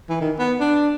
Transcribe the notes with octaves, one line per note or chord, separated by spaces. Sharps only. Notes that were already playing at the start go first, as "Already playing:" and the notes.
E3
D#3
B3
D4